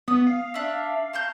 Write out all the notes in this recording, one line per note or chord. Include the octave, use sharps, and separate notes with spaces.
B3 D#6
F5
D4 E5 F5
A5 A#5 G6